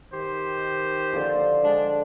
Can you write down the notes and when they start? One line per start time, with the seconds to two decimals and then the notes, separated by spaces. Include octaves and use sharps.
0.13 D#3 G4 C5
1.13 D3 F3
1.65 G#3 D4